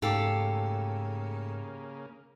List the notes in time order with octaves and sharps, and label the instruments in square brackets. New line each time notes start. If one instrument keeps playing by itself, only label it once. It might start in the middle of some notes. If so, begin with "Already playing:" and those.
[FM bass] G#2 [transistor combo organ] C#3 A#3 [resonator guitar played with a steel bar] A3 A4 [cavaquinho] G4 F5 D6